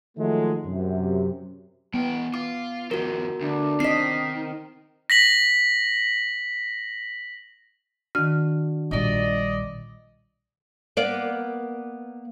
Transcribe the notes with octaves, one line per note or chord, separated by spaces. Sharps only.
D#3 F3 F#3 G#3 A3
F#2 C3
E3 B3 G5
F4 D6
D#2 F3 F#4 A#4
D2 D4
D#3 C4 D#5 B6 C7
A#6 B6 F#7
D#3 D4 F#4 F6
A#1 G3 D5 D#5
A#3 B3 D5